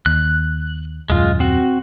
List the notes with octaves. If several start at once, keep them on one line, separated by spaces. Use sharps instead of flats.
D#2 F#6
D#1 F#2 G#3 F4
C4 F#4